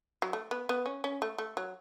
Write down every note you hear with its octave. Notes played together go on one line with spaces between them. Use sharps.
F#3
A3
B3
B3
C#4
C#4
A3
A3
F#3